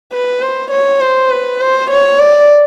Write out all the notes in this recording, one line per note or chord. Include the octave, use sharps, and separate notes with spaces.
B4
C5
C#5
C5
B4
C5
C#5
D5